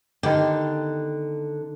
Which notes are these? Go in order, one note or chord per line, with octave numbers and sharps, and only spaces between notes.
D3 D#3 B3 G4